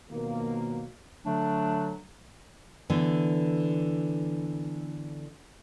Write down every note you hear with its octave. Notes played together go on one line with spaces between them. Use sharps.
B2 D#3 F3 F#3 A#3
D3 F#3 A3 D4
D3 E3 B3